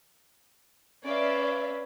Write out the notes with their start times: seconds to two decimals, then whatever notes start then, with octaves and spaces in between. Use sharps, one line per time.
1.04 C#4 B4 D5 E5 F5